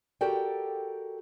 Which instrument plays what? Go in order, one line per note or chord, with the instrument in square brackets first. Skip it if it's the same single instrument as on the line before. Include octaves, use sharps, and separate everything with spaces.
[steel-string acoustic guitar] F#4 G4 A4 A#4 D5 G5